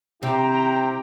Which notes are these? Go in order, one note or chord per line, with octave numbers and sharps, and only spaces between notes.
C3 C4 E4 G4 G5 A#5